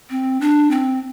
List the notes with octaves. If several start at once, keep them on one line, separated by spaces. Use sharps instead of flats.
C4
D4
C4